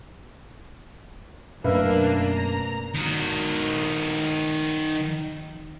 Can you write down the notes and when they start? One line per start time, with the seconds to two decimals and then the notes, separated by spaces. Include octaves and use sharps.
1.64 F#2 B2 A3 A#3 D4 B4 E5 F5
2.32 A#5
2.94 D#3 F#4